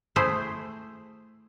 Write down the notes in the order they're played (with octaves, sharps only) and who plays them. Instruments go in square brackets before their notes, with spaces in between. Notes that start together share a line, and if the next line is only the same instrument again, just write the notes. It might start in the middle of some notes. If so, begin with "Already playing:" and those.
[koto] A3 E4 G#4 C5